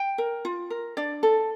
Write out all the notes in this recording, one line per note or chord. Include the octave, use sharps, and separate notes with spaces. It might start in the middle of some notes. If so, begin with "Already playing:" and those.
Already playing: G5
A#4
F4
A#4
D4 D5
A4